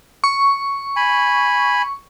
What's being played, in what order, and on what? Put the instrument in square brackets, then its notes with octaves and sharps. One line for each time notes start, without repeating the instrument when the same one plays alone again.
[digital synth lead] C#6
[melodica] G#5 B5